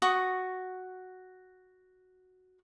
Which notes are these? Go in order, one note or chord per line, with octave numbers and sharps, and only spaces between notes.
F#4 C#6 D#6